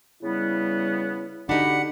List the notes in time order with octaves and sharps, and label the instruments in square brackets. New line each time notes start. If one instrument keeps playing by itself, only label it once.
[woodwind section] C#3 G3 B3 [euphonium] E4
[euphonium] D3 [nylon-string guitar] D4 D#4 [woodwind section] F#4 G4 B5 [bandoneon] F#5